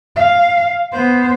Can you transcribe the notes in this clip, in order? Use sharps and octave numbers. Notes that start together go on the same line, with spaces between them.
F5
B3 C5